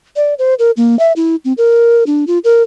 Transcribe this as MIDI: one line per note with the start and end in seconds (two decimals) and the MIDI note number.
0.16 0.34 74
0.39 0.54 72
0.59 0.71 70
0.77 0.98 58
0.99 1.12 76
1.16 1.36 64
1.45 1.53 60
1.58 2.03 70
2.07 2.25 62
2.27 2.38 65
2.44 2.62 70